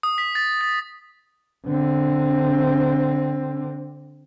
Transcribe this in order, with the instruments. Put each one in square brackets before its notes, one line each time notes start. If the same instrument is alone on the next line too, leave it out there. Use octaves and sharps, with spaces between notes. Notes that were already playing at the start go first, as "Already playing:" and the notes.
[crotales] D#6
B6
A6
A6
[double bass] D3 C4